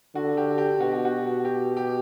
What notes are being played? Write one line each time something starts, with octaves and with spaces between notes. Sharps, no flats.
D3 F#4
G4
G4
B2 F#4
G4
F#4
G4
G4